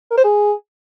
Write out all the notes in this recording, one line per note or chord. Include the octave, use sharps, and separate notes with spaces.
A#4
C5
G#4